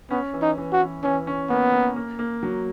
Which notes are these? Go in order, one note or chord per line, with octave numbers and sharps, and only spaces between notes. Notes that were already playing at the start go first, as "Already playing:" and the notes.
B3 C#4
E3
D#4
E3
F#4
E3
E3 C#4
C#4
A#3 B3
A#3
A#3
A#3
F#3